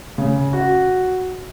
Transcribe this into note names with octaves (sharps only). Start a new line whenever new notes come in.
C#3
F#4